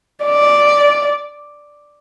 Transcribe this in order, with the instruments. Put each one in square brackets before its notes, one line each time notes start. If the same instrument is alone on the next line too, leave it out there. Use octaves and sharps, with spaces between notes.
[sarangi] D5